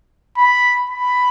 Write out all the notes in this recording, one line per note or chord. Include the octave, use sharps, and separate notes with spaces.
B5
B5